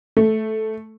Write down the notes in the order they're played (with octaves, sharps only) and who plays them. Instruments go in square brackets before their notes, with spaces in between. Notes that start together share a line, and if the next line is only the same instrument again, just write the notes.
[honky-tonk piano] A3